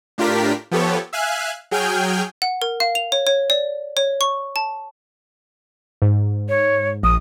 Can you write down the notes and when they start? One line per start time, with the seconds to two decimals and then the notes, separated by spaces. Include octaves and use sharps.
0.18 A2 D4 F4 G4 A#4 B6
0.71 F3 B3 G4 A4 C#5
1.13 E5 F5 G#5 F#6
1.71 F#3 G#4 G5 G#5 F6 G6
2.42 F#5
2.62 A#4
2.80 F5
2.95 F7
3.12 C#5
3.27 C#5
3.50 D5
3.97 C#5
4.21 C#6
4.56 A5
6.02 G#2
6.48 C#5
7.03 A#1 D#6